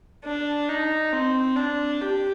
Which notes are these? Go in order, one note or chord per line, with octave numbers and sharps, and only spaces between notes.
D4
D#4
C4
D4
G4